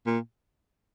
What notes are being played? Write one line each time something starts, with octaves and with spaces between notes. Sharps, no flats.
A#2